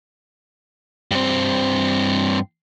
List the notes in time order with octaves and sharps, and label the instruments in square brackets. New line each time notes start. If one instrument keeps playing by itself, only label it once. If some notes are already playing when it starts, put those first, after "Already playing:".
[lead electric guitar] G2 C4